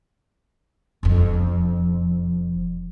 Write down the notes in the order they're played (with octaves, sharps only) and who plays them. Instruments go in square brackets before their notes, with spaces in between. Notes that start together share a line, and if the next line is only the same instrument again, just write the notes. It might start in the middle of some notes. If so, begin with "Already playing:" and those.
[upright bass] E1 F2